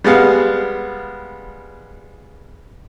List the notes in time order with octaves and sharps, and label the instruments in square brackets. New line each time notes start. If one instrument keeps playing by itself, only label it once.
[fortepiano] G3 G#3 B3 F5